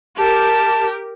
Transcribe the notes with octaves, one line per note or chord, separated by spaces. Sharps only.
G4 A#4 A5